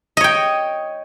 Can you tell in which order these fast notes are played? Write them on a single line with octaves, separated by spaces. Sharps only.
D#5 C#5 G5